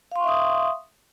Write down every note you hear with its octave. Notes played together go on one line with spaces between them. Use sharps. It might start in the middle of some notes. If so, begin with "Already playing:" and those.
E5 F5 C6 C#6 D#6